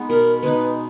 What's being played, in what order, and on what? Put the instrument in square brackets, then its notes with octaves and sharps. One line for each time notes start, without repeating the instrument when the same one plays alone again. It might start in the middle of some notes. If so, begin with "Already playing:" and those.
Already playing: [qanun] G#3 B3 D#4
[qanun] B2 [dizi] A#4
[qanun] G#3 B3 D#4 [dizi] B4